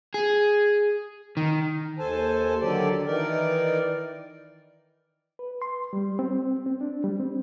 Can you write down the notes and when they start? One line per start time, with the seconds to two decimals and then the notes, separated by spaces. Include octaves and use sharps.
0.14 G#4
1.37 D#3
1.99 D#2 A4 C5 G#5 A5
2.61 D3 D#3 F#3 G4 A4 D5
3.06 D#3 E3 D#4 A#4 D5
5.39 B4
5.62 C6
5.93 G3
6.19 C4
6.66 C4
6.81 D4
7.04 G3
7.20 C4